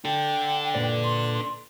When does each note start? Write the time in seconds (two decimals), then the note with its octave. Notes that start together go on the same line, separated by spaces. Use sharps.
0.05 D4 A4 G5
0.74 A#2 B4 D5
1.04 C6